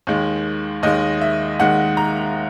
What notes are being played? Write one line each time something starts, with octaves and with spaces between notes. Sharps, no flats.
D#2 D#3 G#3
D#2 D#3 G#3 D#5
E5
D#2 D#3 G#3 F#5
A#5